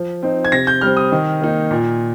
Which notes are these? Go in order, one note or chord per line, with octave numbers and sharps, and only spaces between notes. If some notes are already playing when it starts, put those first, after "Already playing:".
Already playing: F3
C4 D#4
G#6
C3 A#6
G6
G3 C4 F6
D#6
D#3
A#3 D#4
A#2